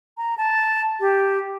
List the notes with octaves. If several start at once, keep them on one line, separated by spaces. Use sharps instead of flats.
A#5
A5
G4